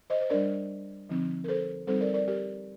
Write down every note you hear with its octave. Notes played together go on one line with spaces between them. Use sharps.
C5 D#5
C5
G3 D4 A#4 D5
D3 F3 C4 D#4
A#4
A4 C5
G3 C4 D#4 A4 C5
A#4 D5
A#4 D5
G4 A#4